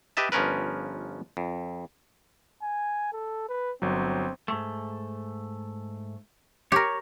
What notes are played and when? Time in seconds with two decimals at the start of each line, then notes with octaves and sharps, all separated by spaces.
0.17 G4 B4 D#5 E5 A5
0.32 G1 F3 C#4 A#4 B4
1.37 F2
2.62 G#5
3.12 A4
3.49 B4
3.82 G1 F#3 C4
4.48 G#2 A3
6.72 G4 A#4 C#5